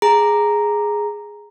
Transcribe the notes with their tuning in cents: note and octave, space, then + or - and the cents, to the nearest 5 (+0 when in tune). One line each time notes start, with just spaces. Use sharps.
G#4 +0 A#5 +0